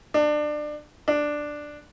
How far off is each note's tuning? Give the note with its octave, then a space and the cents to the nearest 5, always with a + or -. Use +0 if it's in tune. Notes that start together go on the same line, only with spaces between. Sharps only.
D4 +25
D4 +5